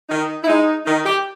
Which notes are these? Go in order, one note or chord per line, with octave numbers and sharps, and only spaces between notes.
D#3 D#4
E4
G#3 D#4
D#3 D#4
G4